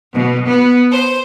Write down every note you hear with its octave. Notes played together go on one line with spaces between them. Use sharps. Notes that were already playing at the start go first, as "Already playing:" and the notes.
B2
B3
C5